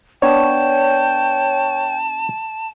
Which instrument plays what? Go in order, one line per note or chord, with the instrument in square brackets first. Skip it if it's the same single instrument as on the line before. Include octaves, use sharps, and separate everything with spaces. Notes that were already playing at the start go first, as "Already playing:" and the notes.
[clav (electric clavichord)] B3 D4 [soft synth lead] C#5 [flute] G5 [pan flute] A5